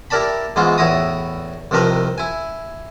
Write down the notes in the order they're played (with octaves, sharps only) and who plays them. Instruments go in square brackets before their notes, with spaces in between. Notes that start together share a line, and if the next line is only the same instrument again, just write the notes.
[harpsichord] E4 G4 A#4 D5 A5 B5
G#2 E3 G#3 B3 F4 F#4
E2 A2 E4 F#4 A#5 D#6
C2 C3 D#3 F3 A#4 B4
E4 G#5